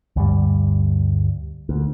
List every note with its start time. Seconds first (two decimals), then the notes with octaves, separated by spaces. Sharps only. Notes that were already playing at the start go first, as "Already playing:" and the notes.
0.16 D2 G2 G3
1.69 D2